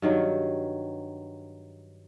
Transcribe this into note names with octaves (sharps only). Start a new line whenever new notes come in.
G2 D#3 F#3